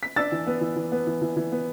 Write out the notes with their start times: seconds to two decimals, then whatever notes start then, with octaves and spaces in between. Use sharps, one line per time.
0.03 B6
0.16 D4 E6 A6
0.32 E3
0.47 B3
0.61 E3
0.76 E3
0.92 B3
1.07 E3
1.22 E3
1.37 E3
1.52 B3